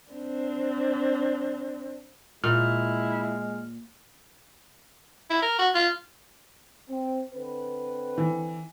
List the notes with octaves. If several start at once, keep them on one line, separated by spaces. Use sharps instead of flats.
C4 D4
A#2 G#3 E4 F6
E4
A#4
F#4
F4
C4
D3 C4 B4
E3